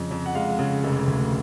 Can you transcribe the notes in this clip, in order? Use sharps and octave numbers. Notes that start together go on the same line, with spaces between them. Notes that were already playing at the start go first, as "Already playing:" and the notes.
Already playing: F2 C#3
F2
F#5
G#3 F5
C#3
F1
D2